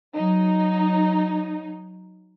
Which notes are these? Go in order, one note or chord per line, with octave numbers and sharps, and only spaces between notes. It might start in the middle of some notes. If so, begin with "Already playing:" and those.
F#3 D#4